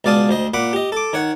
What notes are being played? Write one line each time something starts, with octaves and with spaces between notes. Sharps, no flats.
C#2 B2 D5 F5 A5 D#6
D2 C5 D#5
A#2 F#5 B5 D6
G4 D#5
A4 D6
D#3 C#5 F#5